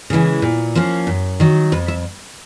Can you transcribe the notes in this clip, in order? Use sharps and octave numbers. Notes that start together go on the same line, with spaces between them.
C#3 E3 G#3
A#2
F3 A#3 C#4
F#2
D#3 F#3
F2 B4
E5